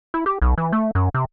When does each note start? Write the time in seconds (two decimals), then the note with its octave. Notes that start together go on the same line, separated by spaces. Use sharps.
0.14 E4
0.26 G4
0.42 B1
0.58 E3
0.73 A3
0.95 F#2
1.14 C3